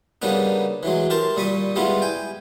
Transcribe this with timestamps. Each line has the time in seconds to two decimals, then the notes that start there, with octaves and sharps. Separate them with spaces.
0.22 C#3 G3 A#3 B3 D4 D#4
0.83 E3 F#3 G#3
1.10 G4 A#4 A5 C6
1.36 A#2 G3 B5 C#6 D#6
1.76 G3 G#3 B3 E4 F4
2.02 G5 G#5